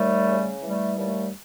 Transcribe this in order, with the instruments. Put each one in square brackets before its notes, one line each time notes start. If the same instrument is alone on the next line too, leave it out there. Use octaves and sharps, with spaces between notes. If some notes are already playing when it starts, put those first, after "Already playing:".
Already playing: [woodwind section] D#2 G3 A3
C#3
E3 G3 A3
D#2 G3 A3